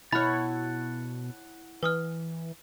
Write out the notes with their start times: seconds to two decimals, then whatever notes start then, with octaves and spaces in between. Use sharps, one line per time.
0.12 B2 E4 C#5 F#5 A5 B5 F6
1.83 E3 B4 D#6 F6